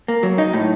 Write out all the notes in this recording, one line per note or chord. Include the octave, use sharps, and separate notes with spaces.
A#3
F#3
D#4
A2